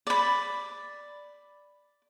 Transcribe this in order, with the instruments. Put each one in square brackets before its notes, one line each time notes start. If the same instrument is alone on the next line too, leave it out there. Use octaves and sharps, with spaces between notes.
[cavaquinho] D5 B5